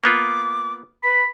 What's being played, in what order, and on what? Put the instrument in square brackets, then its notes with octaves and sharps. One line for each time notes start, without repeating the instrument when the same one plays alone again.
[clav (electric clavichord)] A#3 B3 F4 [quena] D6
[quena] B4 [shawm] B5